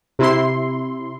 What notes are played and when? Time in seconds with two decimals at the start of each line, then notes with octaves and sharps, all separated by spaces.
0.19 C3 E4 C6